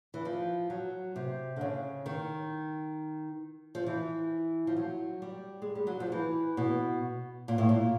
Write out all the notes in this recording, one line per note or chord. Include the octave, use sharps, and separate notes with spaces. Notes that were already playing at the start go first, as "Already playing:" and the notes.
E3
F3
F#3
C3
D3
C#3
D#3
F3
E3
F3
F#3
G3
G#3
G3
F#3
F3
E3
B2
A#2
A2
A#2